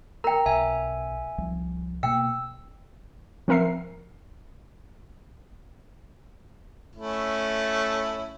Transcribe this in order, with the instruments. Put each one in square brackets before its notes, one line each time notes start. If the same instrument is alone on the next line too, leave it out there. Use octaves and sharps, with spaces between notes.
[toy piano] A#4 G5 [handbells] A#5
[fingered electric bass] B1 [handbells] E5 G#5
[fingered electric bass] C2 F3
[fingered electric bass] B2 A#3 [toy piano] G5 [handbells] E6
[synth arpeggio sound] F3 C4 A#4 E5 C7
[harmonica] A3 C#4 E4